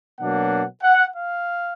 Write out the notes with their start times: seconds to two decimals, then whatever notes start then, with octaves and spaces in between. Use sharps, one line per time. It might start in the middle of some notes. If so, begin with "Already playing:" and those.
0.18 B2 F#3 A#3 D4 F#5
0.83 F#5
1.15 F5